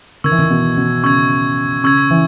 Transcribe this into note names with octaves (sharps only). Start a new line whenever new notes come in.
D#3 C#6 E6 G#6
E3
D#3
B2
B2
C#3 C#6 E6 G#6
C#3 C#6 E6 G#6
E3